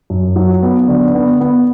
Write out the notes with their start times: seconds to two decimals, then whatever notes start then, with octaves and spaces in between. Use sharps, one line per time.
0.10 F#2
0.36 F#3
0.63 B3
0.88 D3
1.15 B3
1.41 B3